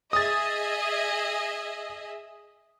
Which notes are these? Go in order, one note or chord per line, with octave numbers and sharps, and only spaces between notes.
G#4 D#5 E5 D#6 A6